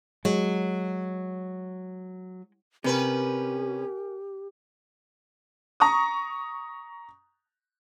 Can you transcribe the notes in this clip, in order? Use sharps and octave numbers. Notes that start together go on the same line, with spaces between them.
F#3 G#3
C3 C#4 G4 A#4 B4 G#5
A#5 C#6 D#6